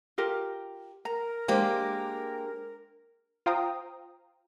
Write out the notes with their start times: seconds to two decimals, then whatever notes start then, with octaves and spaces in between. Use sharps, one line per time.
0.18 F4 G4 A#4
1.05 A#4 A#5
1.48 G#3 A#3 D4 G4 C5
3.46 F4 C5 F5 G5 A#5 D#6